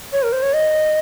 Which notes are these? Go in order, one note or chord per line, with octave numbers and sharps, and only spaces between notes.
C#5
A#4
C5
C#5
D#5